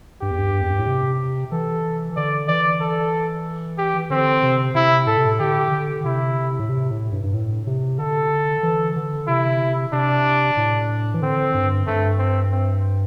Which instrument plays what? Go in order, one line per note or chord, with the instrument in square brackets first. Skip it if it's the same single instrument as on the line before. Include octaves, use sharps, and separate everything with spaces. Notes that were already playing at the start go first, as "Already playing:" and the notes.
[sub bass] G2 [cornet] G4
[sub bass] E2
G2
E2
G2
A2
C3
[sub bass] E3 [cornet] A4
[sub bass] D3 [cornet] D5
[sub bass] E3 [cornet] D5
[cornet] A4
G4
[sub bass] D3 [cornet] C4
[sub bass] C3
[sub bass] C3 [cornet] E4
[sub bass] A2 [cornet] A4
[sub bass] C3
A2
[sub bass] D3 [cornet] G4
[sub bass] D3
[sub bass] C3 [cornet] E4
[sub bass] A2
C3
A2
G2
G2
A2
C3
[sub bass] D3 [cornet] A4
[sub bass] E3
D3
[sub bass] C3 [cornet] E4
[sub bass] C3 [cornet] D4
[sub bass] A2
E3
[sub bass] D3 [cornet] C4
[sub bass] G2
[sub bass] G2 [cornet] A3
[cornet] C4
C4